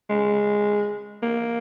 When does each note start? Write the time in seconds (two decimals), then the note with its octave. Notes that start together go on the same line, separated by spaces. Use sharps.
0.09 G#3
1.23 A#3